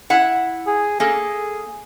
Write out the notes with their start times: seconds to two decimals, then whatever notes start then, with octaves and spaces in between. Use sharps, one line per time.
0.10 E4 F#5
0.67 G#4
1.00 A#3 G#4 A4